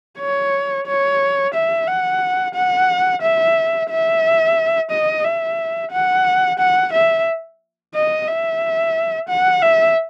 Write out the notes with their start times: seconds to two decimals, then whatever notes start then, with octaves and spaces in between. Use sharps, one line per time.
0.20 C#5
0.87 C#5
1.54 E5
1.87 F#5
2.55 F#5
3.22 E5
3.90 E5
4.91 D#5
5.24 E5
5.92 F#5
6.59 F#5
6.93 E5
7.94 D#5
8.28 E5
9.29 F#5
9.62 E5